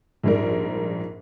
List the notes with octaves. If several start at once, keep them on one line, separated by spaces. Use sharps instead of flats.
A#1 F2 G#2 G3 A#4